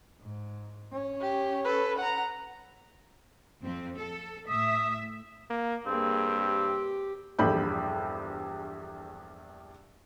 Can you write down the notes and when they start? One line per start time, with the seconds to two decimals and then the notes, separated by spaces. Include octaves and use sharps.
0.20 G#2
0.92 C#4
1.21 G4
1.65 A4 B4
1.98 F#5 A#5
3.62 F2 C4
3.97 A4
4.48 A2 E5 D#6
5.50 A#3
5.86 G2 A#3 C4 G#4
6.38 G4
7.39 A#1 E2 G2 A4 B5 G6